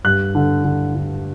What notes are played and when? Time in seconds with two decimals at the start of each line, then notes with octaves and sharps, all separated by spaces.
0.04 G2 F#6
0.35 D3
0.64 D3
0.95 D3